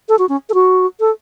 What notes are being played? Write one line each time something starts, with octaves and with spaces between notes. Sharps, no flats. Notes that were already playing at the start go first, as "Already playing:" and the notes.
A4
F#4
C#4
A4
F#4
A4